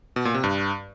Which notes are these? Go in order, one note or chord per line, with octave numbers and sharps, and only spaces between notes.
B2
A#2
C3
G2